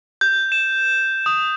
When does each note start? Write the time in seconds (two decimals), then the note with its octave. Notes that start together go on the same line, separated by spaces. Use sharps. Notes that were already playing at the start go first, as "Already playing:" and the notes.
0.21 G6
0.52 E7
1.26 D#6